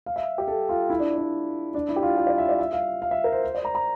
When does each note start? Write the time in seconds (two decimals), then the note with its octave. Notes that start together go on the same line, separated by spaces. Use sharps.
0.06 F5
0.16 E5
0.38 G4
0.48 A4
0.69 F4
0.90 E4
1.00 D4
1.18 D4
1.74 D4
1.89 E4
1.96 G4
2.03 F4
2.17 G4
2.27 D5
2.38 E5
2.49 D5
2.59 E5
2.73 F5
3.02 F5
3.11 E5
3.24 A#4
3.32 C5
3.43 C5
3.55 D5
3.65 A#5
3.75 A#5